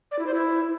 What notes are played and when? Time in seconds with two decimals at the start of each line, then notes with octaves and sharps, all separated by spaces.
0.11 D5
0.19 E4
0.27 C5
0.34 E4